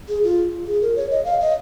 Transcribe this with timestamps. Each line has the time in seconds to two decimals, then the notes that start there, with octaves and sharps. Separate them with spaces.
0.08 G#4
0.23 F4
0.67 G#4
0.82 A#4
0.96 C#5
1.11 D#5
1.25 F5
1.40 D#5